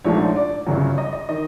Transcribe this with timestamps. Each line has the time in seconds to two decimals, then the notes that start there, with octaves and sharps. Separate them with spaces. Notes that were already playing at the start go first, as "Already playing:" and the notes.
0.04 A#1 G#2 F3 A3 D4 C#5
0.36 D5
0.67 G1 F#2 C#3 F#3
0.98 D#5
1.13 D#5
1.29 D#3 D#5